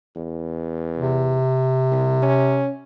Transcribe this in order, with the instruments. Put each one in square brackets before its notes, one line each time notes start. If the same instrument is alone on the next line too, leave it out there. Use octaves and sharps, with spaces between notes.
[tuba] E2
[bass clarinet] C3
[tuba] C2
C#4